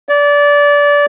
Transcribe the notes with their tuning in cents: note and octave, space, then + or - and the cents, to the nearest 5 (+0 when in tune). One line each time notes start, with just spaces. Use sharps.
D5 -25